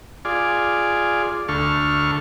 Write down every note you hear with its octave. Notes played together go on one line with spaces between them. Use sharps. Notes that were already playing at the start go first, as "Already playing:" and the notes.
F4 G#4 D5
D2 A4 C#6 F6